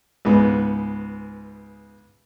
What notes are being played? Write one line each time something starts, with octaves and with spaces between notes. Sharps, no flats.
C#2 G#2 B3